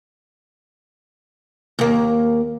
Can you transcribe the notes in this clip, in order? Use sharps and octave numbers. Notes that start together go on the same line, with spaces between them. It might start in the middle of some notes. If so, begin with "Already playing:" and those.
D#2 A#3